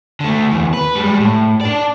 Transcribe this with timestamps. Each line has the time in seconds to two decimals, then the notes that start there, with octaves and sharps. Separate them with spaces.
0.20 D3 A3
0.51 D#2 E3
0.74 B4
0.95 G3 G#3
1.20 A2
1.61 D4 D5